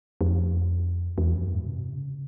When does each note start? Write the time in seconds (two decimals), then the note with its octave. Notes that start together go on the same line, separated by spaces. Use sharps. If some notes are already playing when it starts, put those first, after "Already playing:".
0.21 F2
1.18 E2
1.30 F2
1.42 F#2
1.54 G#2
1.67 C3
1.91 C#3